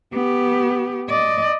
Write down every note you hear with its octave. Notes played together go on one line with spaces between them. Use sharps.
B3 G4
D5 D#5